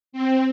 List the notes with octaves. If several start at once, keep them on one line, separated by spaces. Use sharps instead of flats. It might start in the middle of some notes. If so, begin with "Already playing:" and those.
C4